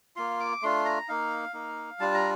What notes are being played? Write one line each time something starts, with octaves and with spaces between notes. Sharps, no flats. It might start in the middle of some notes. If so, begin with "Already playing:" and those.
A#3 F4 C6
D6
A3 D4 F4 C6
A#5
A#3 D#4 F5
A#3 D#4
G3 D4 F4 A5
A#5